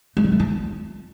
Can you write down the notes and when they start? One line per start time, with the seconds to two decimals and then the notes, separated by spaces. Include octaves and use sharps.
0.17 A3
0.24 G3
0.32 A3
0.40 F4